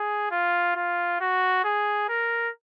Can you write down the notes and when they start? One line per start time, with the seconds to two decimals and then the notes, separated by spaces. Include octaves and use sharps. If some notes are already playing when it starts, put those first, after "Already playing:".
Already playing: G#4
0.31 F4
0.76 F4
1.20 F#4
1.64 G#4
2.09 A#4